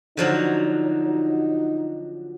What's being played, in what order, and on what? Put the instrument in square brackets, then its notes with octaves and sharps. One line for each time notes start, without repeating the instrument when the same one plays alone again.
[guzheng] D3 F3 F#3 [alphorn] D#4